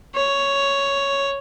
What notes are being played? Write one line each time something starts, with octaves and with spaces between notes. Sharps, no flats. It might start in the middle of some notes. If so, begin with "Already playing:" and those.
C#5